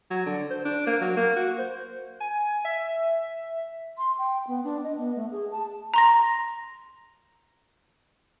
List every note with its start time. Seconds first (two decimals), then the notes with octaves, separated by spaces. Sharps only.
0.11 F#3
0.26 D3
0.51 C5
0.65 D4
0.87 A#3
1.01 F#3
1.17 A#3
1.37 F#4
1.59 C5
2.20 G#5
2.65 E5
3.98 C6
4.18 G5
4.47 B3
4.64 D4
4.83 D#5
4.97 B3
5.16 A3
5.32 G#4
5.52 A5
5.94 A#5 C6 A#6